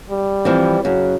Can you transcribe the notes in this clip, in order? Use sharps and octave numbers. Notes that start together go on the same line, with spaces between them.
G3
E3 F3 C4
F#2 C#3